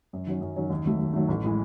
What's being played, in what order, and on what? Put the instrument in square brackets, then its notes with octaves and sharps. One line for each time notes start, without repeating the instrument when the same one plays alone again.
[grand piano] F#2
D#3 F#3 C#4
F#2
D#3 F#3 C#4
D#2
D#3 F#3 A3
D#2
D#3 F#3 A3
A1
A2 E3 G#3